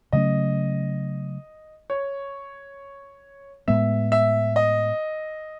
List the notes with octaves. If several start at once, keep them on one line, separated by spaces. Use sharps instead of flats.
C#3 F#3 A3 C#4 D#5
C#5
A2 G#3 B3 E5
E5
D#5